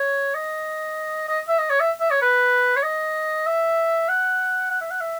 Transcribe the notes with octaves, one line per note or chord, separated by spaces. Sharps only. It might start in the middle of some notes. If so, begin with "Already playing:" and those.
Already playing: C#5
D#5
D#5
E5
D#5
C#5
E5
E5
C#5
B4
C#5
D#5
E5
F#5
F#5
E5
F#5
E5